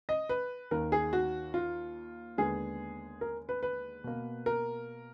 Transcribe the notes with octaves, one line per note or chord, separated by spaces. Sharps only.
D#5
B4
D#2 D#3 A#3 A#4
G#4
F#4
F4
D#2 D3 G#3 B3 G#4
A#4
B4
B4
B2 A#3
A#4